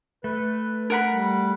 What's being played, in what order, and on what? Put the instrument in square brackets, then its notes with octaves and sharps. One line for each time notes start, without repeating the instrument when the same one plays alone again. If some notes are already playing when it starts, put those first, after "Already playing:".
[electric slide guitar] A3 [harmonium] B4
[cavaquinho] A#4 F#5 B5
[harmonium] G3